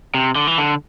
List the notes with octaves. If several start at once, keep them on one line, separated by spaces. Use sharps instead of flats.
C3
D3
E3
D3